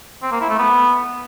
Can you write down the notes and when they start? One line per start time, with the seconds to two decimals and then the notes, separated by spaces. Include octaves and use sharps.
0.23 C4
0.32 A#3
0.41 E4
0.50 A3
0.58 B3